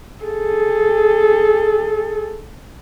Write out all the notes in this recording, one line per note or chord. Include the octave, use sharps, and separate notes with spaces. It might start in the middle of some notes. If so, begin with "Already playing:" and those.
G#4 A4